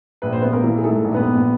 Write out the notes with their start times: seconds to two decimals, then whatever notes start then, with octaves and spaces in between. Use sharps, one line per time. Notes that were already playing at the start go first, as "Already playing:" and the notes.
0.22 A#1 B4
0.33 C5
0.41 A#1 B3 B4
0.53 A#3 A#4
0.64 E3
0.78 G#4
0.84 G#2 A3 A4
1.04 A#1
1.14 B3 B4
1.26 A#1